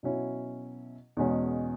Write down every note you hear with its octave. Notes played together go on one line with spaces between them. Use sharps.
B2 F#3 C#4 E4
E2 B2 G#3 C#4